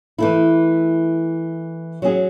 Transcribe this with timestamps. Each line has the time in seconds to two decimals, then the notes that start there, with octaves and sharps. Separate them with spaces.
0.18 E3 A3 E4
2.02 F#3 C#4 G#4